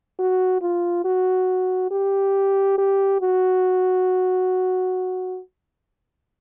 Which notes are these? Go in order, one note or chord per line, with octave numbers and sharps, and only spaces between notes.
F#4
F4
F#4
G4
G4
F#4